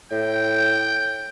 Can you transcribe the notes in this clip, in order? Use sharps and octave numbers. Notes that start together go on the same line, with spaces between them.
A2 G5